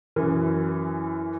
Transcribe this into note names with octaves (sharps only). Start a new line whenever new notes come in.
F#2 E3